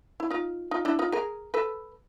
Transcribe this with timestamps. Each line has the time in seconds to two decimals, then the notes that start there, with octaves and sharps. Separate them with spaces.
0.20 E4
0.30 D#4 F4
0.71 D#4 F4
0.85 D4 E4
0.99 D#4 F4
1.12 G#4 A#4
1.54 A4 B4